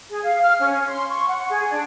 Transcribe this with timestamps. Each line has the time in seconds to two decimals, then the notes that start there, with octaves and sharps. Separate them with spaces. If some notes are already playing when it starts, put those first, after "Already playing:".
0.10 G#4
0.24 F5
0.42 F6
0.60 C#4
0.88 C6
1.10 C#6
1.28 F#5
1.50 G#4
1.71 D4